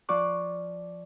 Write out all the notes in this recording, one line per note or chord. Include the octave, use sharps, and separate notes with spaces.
F3 F4 D5 C#6 D6 F#6